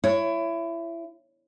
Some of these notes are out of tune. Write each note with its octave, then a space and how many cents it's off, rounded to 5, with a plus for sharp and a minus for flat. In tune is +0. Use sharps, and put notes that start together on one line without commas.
E4 +25 C#5 +5